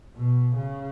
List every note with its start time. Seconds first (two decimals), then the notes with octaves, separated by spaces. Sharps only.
0.16 B2
0.56 C#3